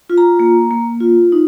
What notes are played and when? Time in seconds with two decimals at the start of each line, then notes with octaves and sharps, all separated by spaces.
0.10 F4
0.18 A#5
0.39 A#3
0.71 A#3
1.01 F4
1.32 D#4